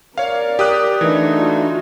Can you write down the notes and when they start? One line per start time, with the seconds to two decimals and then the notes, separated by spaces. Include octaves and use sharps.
0.18 A#4 C#5 D5 F5
0.59 G4 D#6 F#6
1.01 D3 E3 A3 D#4
1.34 F4 F#4